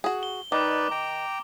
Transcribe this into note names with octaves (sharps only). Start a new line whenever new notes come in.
F#4 G#4
G7
D#3 D#4 B4 D5 D6
G5 A#5